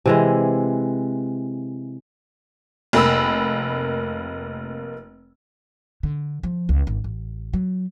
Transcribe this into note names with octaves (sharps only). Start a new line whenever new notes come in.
C3 E3 G#3
F1 A#3 B5 E6
D3
F3
C#2
G#1
A1
F#3